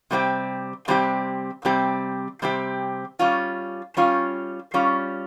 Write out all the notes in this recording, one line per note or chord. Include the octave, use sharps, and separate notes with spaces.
C3 G3 C4 G4
C3 G3 C4 G4
C3 G3 C4 G4
C3 G3 C4 G4
G3 C#4 F4
G3 C#4 F4
G3 C#4 F4